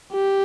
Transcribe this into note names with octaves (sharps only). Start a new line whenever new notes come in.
G4